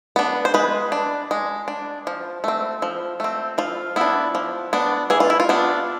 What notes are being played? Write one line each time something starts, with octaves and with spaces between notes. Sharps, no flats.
B3 D4
C5
G#3 B4
D4
G#3
D4
F3
A3 C4
F3
A3 C4
F3 F4
B3 D4 E4
F3
B3 D4
E3 G#4
F4
E4
F4
B3 D4